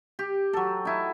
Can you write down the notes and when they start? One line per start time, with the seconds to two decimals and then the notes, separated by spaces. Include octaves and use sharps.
0.19 G4
0.53 F#3 A4
0.85 D#4 E4